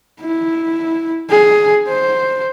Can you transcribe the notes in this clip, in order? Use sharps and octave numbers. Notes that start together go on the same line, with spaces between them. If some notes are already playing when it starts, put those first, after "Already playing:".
E4
G#4
C5